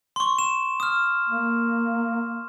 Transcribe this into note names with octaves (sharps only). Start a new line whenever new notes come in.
C6 C#6
E7
D#6 F6
A#3